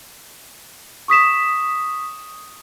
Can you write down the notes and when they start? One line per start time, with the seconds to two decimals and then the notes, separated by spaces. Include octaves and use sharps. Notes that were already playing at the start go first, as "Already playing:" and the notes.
1.08 C#6 D#6 B6 E7